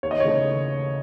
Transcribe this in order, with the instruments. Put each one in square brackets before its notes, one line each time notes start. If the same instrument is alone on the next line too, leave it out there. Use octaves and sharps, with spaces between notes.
[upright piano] D#2 C#5
D#5
C#3 E3 A3 C#5